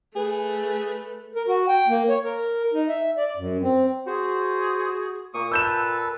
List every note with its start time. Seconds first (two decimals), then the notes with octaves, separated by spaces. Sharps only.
0.16 A3 G#4 B4
1.35 A#4
1.48 F#4
1.68 G5
1.88 A#3
2.09 C#5
2.24 A#4
2.73 D#4
2.89 E5
3.18 D5
3.37 F#2
3.62 C4
4.06 F#4 G#4 C5
5.34 A#2 A#3 C#6 D#6
5.52 A4 B4 A5 E6 G6 E7